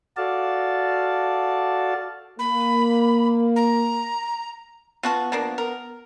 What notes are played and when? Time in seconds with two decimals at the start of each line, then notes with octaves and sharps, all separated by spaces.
0.17 F#4 A4 D5 F5 A5
2.39 A#3 B5
3.56 A#5
5.03 B3 F4 F#4 A5
5.32 F3 A#3 D4
5.58 A#4